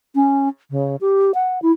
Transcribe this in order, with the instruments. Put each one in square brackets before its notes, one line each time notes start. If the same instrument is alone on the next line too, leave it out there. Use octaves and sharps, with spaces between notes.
[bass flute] C#4
C#3
G4
F#5
E4